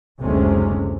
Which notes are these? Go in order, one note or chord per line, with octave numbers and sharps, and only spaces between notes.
F#1 D2 C3 G#3 A3 C#4